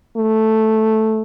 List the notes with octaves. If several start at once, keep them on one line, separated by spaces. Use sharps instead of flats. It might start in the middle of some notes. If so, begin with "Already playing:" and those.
A3